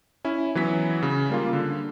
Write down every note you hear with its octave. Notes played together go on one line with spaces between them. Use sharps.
C#4 E4
E3 F#3 B3 B6
C#3
G3 A#3 F4
D3